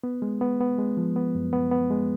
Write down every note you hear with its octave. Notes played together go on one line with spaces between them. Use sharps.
B3
G#3
B3
B3
G#3
F3
B3
F#2
B3
B3
G#3